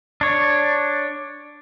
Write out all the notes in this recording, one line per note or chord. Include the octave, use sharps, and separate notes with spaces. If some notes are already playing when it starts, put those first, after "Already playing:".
D4 C#5